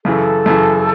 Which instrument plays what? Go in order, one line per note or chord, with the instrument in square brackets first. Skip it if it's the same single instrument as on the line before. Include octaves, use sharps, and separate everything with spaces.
[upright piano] F#2 C#3 E3 [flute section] A4
[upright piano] F#2 C#3 E3